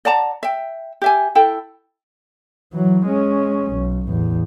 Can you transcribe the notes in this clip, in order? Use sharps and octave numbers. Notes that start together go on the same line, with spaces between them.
D5 F#5 A5 A#5
E5 G5
G4 E5 G#5
E4 A4 G5
E3 F#3
G#3 C#4
B1
A1 E2